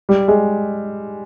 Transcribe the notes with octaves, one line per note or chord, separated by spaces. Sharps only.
G3
G#3